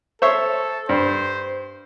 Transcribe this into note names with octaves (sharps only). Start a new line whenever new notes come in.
A4 C5 C#5 E5
G2 C5